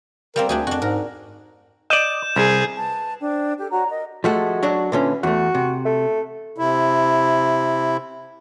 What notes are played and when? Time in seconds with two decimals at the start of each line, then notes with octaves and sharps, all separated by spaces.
0.36 G3 A#3 C4 A#4
0.49 D2 D4 G4 G#4
0.67 F2 D4 F#4
0.82 G#2 A#4
1.90 D5 D#5 G6 E7
2.36 C2 G#4
2.77 B4 A5
3.21 D4 C5 G5
3.59 G4 A4
3.71 F#4 C#5 D5 A#5
3.90 A#4 D#5
4.24 F3 G#3 A3 F#4
4.63 F#3 D4 F#4
4.92 A#2 D3 E3 C#4
5.23 E2 A3 F#4
5.55 C3
5.85 A3
6.58 C3 E4